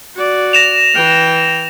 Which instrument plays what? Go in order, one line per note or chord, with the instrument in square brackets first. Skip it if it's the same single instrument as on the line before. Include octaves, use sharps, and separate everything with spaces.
[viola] F#4 D5
[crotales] A#6 E7 F7
[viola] E3 G5